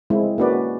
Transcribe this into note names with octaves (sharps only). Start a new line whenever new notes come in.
G#3 C4 E4
A#3 C#4 F#4 B4 D5